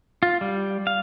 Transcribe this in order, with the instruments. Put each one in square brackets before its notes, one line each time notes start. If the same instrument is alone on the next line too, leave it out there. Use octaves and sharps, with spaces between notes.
[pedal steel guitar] F4
G3
F5